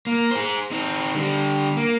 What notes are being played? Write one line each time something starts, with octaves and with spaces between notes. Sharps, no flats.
A#3
G#4 C5
C4 D#4
D3 G3
A#3